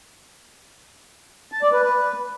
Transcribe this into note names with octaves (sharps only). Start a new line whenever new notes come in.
A5
D5
B4
B4